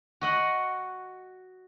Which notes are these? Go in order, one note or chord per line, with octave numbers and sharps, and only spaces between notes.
F#4 D#5 F#5